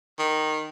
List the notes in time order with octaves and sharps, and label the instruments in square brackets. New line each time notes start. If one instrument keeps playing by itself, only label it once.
[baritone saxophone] D#3